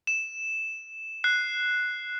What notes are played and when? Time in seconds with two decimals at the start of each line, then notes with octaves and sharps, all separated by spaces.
0.07 E7
1.24 F#6 C7